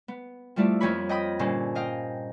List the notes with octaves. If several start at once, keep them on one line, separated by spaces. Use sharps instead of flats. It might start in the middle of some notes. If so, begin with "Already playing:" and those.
B3
F3 G3 A3 E4 F4 D5
F2 F3 A#3 C#5 B5
D#5 G5 B5 D#6
G2 A#2 D3 C#4 C5
D#5 F5 G5